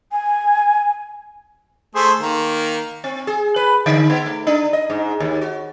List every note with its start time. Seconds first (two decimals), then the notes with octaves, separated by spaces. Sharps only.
0.12 G#5
1.95 A3 G#4 C5
2.20 D#3 A#3
3.04 C4
3.27 G#4
3.56 B4
3.86 D3
4.10 B3
4.26 A3
4.47 D4
4.73 D#5
4.90 G#2
5.20 D#2
5.41 F#4